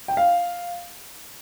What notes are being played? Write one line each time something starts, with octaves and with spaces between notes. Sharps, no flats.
G5
F5